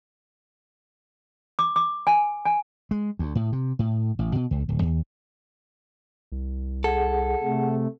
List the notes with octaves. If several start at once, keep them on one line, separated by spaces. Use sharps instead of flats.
D6
D6
G#5
G#5
G#3
D2
A2
C3
A2
A1
B2
C#2
D1
D#2
C2
G#4 A4 F#5
C3 A3